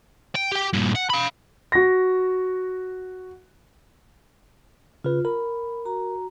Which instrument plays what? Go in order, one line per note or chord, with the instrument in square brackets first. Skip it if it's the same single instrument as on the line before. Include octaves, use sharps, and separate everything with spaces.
[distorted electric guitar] G5
G4 G5
G2 A#2
F#5
F5 B5
[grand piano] F#4 A#6
[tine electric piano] C#3 B4 [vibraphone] F4
[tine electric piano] A#4 [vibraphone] B5
[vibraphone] F#4 A#5